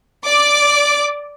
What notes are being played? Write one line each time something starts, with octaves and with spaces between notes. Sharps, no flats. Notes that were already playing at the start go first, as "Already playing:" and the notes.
D5 D6